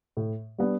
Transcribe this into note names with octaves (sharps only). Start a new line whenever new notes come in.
A2
G3 B3 D4